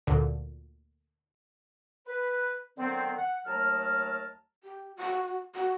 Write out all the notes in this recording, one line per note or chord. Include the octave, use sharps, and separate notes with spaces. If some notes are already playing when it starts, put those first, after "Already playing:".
D2 A#2 D3
B4
D3 D#3 F#3 B3 C4
F#5
D#2 F#3 A3 A5 A#5 F6
G4
F#4
F#4